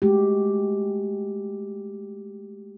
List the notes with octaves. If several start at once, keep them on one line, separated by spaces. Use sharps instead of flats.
G#3 A3 F#4 G4